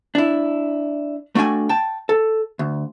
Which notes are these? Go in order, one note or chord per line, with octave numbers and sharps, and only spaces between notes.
D4 E4
A3 D4 F#4 G5 G#5
G5 A5
A4
D2